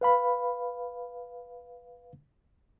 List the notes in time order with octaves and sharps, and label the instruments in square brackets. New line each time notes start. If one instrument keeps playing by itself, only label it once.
[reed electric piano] B4 F5 B5